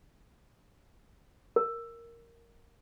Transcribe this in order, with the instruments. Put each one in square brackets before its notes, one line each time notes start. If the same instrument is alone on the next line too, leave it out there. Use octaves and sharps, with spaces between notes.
[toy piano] A#4